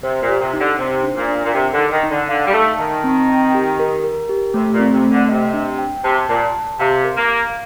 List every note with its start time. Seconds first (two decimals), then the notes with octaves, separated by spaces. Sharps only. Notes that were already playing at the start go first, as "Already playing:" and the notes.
0.03 C3 C5
0.23 A#2
0.28 G4
0.41 C3
0.53 D#4
0.60 D3
0.79 C3 C5
1.04 D4
1.16 A#2
1.28 D4
1.45 A#2
1.54 C3 A#4
1.73 D3
1.79 D#4
1.91 D#3
2.03 D#4
2.10 D3
2.29 D3 F5
2.47 G3
2.53 A3 A5
2.79 D#3 A5
3.04 C4
3.30 G5
3.55 G4
3.79 A#4
4.04 A#4
4.29 G4
4.54 C3 A3
4.73 A#2
4.79 C4
4.92 C3
5.04 A3
5.11 D3
5.29 C3 D#5
5.54 D4
5.79 G5
6.04 C3 A5
6.29 A#2 A5
6.55 A5
6.79 C3 F5
7.04 A#4
7.17 A#3
7.29 F5